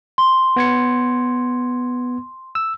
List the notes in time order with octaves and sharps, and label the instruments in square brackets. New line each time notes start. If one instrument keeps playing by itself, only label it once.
[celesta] C6
[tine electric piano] B3 G#6 C#7
E6